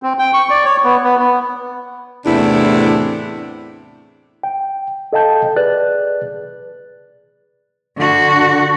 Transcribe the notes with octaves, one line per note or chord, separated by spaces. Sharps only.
C4
G5
C#6
D5
C#5
B3
B3
B3
E2 A2 C3 D4 E4
G5
A4 D#5 F5 G5 A5 G6
G#4 B4 D5 F#6 A6
D3 F#4